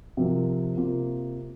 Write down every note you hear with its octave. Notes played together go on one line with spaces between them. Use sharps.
C3 F3 C4 F4 A#4
C3 A#3 F4